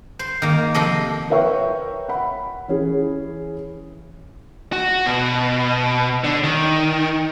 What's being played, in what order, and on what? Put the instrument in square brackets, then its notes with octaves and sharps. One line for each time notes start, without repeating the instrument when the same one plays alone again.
[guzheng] C5
D#3 A#3
C3 F3 A4 D#5
[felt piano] A#4 B4 C#5 E5 G5 C#6
F#5 B5
E3 C#4 G#4
[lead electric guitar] F#4
B2
D3
D#3